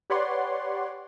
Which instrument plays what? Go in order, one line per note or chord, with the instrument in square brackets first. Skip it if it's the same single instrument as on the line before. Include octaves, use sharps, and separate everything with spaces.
[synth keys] G4 B4 C#5 D5 F#5 C6